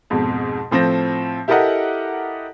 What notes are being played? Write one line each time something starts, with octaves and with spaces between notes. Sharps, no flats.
F2 G#2 B2
A2 F3 C4 A4 A#6
E4 G4 A4 A#4 D#5 F#5